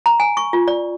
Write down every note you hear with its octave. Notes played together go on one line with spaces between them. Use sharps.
A#5
G#5
C#6
F4
D5